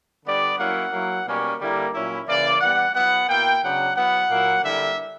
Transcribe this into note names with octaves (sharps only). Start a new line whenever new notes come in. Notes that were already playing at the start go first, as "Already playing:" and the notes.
D3 G3 B3 D4 D5
F#3 A#3 C#4 E4 F#5
F#3 A#3 E4
B2 G3 A#3 C#4
D3 G3 A#3 E4
A#2 F#3 C#4 E4
C#3 E3 A#3 D5
E3 G3 B3 F#5
F#3 B3 E4 F#5
B2 A#3 E4 G5
C#3 F#3 B3 D4 F#5
F#3 B3 E4 F#5
A#2 F#3 A#3 E4
D3 G3 A#3 E4 E5